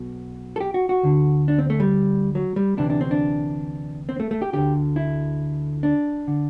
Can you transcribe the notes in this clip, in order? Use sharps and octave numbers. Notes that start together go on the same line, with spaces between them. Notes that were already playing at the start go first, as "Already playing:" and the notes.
Already playing: B1 B2
A4
G4
F#4
F#4
D2 D3
D4
C4
A3
G3
F#3
G3
D2 C3 E3 D4
D4
C4
D4
C4
A3
A3
G4
D2 D3 G4
E4
D4
D3